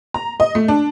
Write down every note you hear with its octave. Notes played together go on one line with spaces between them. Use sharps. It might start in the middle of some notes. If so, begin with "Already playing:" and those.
A#5
D#5
A3
D4